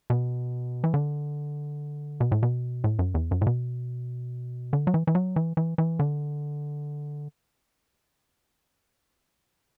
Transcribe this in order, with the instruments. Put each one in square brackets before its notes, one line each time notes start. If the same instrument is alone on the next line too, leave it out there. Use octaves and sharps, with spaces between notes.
[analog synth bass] B2
E3
D3
B2
A2
B2
A2
F#2
E2
F#2
A2
B2
D3
F#3
E3
E3
F#3
E3
E3
E3
D3